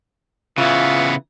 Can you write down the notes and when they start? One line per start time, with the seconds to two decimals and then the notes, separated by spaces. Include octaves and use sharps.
0.58 C#3 E3 B3 F4